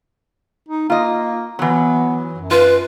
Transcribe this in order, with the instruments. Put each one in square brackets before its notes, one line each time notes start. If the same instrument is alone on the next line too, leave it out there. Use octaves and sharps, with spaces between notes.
[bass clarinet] D#4
[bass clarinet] A#3 [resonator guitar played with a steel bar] F4 D#5
[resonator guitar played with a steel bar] E3 F#3 [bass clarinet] B3
[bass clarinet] F#2
[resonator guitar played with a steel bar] F4 [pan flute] B4